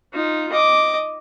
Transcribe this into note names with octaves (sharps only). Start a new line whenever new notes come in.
D#4 F4
D#5 D6